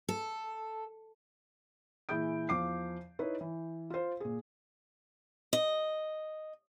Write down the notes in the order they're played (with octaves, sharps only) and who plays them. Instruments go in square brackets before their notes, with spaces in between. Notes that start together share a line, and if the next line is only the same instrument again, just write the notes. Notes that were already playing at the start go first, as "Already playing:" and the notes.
[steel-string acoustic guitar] A4
[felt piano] A#2 E3 E4 G#4 G6 D7
E2 F3 F5 D6 C7
D#4 E4 B4 C#5
E3
F4 C5
A#2 G#4
[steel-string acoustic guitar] D#5